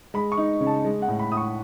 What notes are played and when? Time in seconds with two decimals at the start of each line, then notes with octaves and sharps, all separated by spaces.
0.14 G#3 B5
0.32 C#6
0.37 D#4
0.61 C#3
0.67 A5
0.85 G#3
1.02 F#5
1.08 A2
1.19 B5
1.31 A2 D#6
1.37 C#6